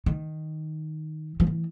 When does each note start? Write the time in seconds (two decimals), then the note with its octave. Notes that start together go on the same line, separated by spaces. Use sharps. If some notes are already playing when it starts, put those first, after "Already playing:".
0.06 D#3
1.40 F3
1.47 E3